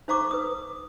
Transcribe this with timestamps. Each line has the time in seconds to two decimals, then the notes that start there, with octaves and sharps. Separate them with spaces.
0.08 D#4 C5 F5 A#5 C#6 D6
0.31 B4 D#6